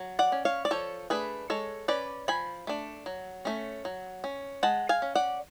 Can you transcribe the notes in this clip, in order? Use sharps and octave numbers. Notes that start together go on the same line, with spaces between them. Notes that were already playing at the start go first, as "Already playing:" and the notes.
Already playing: F#3
D5 F#5
C#4
C#5 F5
D5
F3 A4 C#5
A3 D4 G#4 B4
G#3 A4 C#5
C#4 B4 D5
F3 G#5 B5
A3 D4
F#3
A3 C#4
F#3
C#4
G#3 F#5 A5
F5 G#5
C#4
D5 F#5